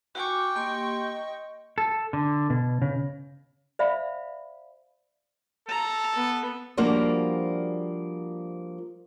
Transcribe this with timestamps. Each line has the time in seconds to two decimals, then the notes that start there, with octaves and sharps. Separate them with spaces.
0.15 F#4 G5 G#5 C#6 D6
0.56 A#3 G4 D#5 C6
1.78 A4
2.13 D3
2.50 B2
2.82 C#3
3.79 C5 D5 E5 F5 B5
5.68 A4 A#5
6.16 B3
6.77 F3 G3 A#3 D4 F#4 C5